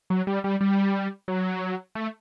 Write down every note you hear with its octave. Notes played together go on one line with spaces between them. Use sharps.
F#3
G3
G3
G3
F#3
A3